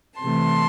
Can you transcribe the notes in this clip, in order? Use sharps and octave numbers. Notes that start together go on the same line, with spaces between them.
C3 E3 A3 A5 C6